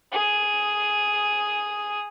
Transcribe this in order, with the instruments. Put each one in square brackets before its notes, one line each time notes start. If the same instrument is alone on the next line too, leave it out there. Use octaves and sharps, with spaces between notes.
[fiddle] G#4 D#6